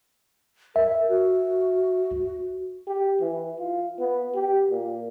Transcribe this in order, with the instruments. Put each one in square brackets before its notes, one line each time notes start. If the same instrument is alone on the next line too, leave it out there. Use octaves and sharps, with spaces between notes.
[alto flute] A#4 [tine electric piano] E5
[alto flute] F#4
[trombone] G4
E3
F4
B3
G4
A#2